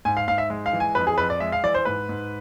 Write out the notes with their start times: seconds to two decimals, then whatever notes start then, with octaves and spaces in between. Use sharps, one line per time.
0.05 G#2 G#5
0.17 F5
0.28 G#2 F5
0.38 E5
0.50 G#3
0.66 F5
0.73 E3
0.80 G#5
0.95 F2 B4
1.07 G#4
1.18 F2 B4
1.30 D5
1.40 G#3 E5
1.52 F5
1.63 E3 D5
1.75 C5
1.85 G#2 B4
2.09 G#2